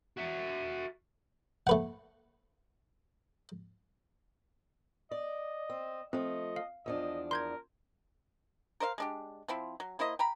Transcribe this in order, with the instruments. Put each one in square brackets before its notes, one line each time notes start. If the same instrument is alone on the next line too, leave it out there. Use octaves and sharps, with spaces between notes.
[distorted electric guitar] F#4 E5
[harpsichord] A3 B4 F#5
[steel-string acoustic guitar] D5 [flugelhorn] D#5
[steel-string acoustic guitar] C4
[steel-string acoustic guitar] F3 A3 [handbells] C4 [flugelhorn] D#5
[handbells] F5
[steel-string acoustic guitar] E2 F3 D4 [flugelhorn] D#5
[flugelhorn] A#4 [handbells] C6 G6 G#6
[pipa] A#4 C5 D#5 F5
G#3 D4 G4
F3 C4 E4
F#3
A#3 E4 C5 D#5
G5 A#5 B5